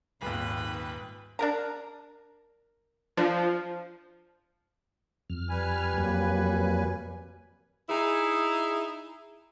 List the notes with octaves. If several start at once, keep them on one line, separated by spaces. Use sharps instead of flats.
D#1 G#1 D#2 B4
D4 A#4 A#5
F3 D4
F2 F6
G3 B4 G#5
F2 F#3 A#3
D#4 E4 G#4